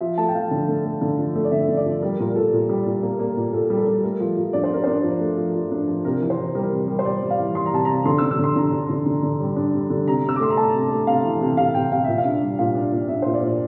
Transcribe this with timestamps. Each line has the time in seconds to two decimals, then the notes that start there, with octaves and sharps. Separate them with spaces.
0.01 F3 E5
0.18 A3 A5
0.29 G5
0.34 F3 F5
0.51 D3
0.68 A3
0.85 A3
1.01 D3
1.18 F3
1.35 A3
1.45 D5
1.52 D3 E5
1.69 D3
1.77 D5
1.86 F3
2.02 G3 A#4
2.19 A#2 A#4
2.36 A#2 A4
2.53 A#2
2.69 G3
2.86 A#2
3.03 A#3
3.19 A#3
3.37 A#2
3.53 A#2 A4
3.70 G3
3.78 A4
3.87 G3
4.03 A3 A#4
4.20 F3
4.37 F3
4.53 D4 D5
4.64 C5
4.71 D4 A#4
4.84 D4 C5
5.03 F3
5.20 A3
5.37 F3
5.55 F3
5.72 D4
5.88 F3
6.05 C3 A#4
6.22 E3
6.30 C5
6.38 E3
6.55 G3 A#4
6.72 C3
6.79 A#4
6.88 G3
6.99 C5
7.05 G3 D5
7.22 G3
7.30 F5
7.39 E3
7.55 G3 C6
7.66 A#5
7.72 C3 A5
7.85 C3 A#5
8.05 D3 C6
8.18 D3 E6
8.31 E6
8.39 D3 C6
8.56 D3 A#5
8.72 D4
8.89 D3
9.06 D3
9.23 D3
9.40 G3
9.56 D4
9.74 G3
9.90 D3
10.07 C3 A#5
10.24 C3 E6
10.36 D6
10.40 A3 C6
10.50 A#5
10.57 A3 A5
10.74 C3
10.91 A3
11.07 C3 F5
11.24 E3
11.41 C3
11.57 C3 F5
11.75 C3 G5
11.91 C3 F5
12.04 A#2 E5
12.18 F5
12.25 D4
12.42 G3
12.59 A#2 F5
12.75 D4
12.92 A#2
13.08 D4 E5
13.22 A#2 C5
13.34 D5
13.42 A#2